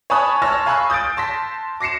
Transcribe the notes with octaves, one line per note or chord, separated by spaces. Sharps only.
C#5 G#5 A5 B5 D#6 F#6
C#5 A5 C6 E6 F6 A#6
F5 G#5 B5 C#6 E6 F#6
D#6 G6 A6 D7
A5 C6 A#6 B6
D6 A#6 C7 C#7 E7